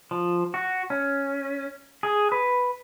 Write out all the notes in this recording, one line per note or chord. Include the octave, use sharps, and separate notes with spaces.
F3
F#4
C#4
G#4
B4